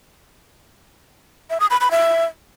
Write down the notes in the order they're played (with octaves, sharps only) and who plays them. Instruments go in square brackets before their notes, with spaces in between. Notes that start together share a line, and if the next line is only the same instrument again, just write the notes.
[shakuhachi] E5
D#6
B5
B5
E5